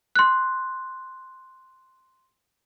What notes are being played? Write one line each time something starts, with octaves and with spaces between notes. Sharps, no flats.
C6 F#6